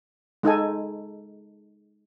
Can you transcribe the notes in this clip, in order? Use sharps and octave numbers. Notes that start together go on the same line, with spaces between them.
G#3 D#4 A4 G#5